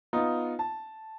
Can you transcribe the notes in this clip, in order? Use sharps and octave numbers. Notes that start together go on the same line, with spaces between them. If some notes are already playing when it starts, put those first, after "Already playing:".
B3 D#4 F4
A5